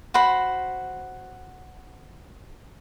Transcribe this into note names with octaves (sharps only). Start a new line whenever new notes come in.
F#4 C5 B5